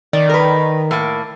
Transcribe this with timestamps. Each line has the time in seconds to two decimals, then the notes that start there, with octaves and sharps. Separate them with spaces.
0.13 D#3 D5
0.29 A#4 B4
0.91 A2 A#3